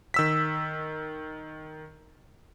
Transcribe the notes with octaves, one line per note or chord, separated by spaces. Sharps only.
D#3 E6 B6